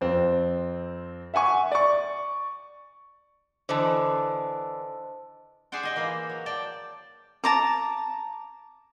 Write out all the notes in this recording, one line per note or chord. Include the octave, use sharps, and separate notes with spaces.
F2 C4
E5 F#5 G#5 C#6
D5 C#6
D3 E3 C5 D#5 A5
G4 G#4 C5 D5 F#5 G5
G#4 D#5 G5
E3 A#3 C5
F#3
D5 G5 A5
A5 A#5 D6